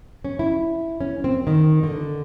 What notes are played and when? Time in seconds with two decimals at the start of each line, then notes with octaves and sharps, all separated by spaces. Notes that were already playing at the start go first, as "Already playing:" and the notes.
0.25 C#4
0.39 E4
1.01 C#4
1.24 C4
1.47 D#3
1.83 D3